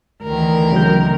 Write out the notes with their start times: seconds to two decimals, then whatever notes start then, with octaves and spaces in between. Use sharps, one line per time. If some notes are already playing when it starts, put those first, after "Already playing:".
0.23 D2 D#3 E3 A#4
0.72 C#3 F#3 G6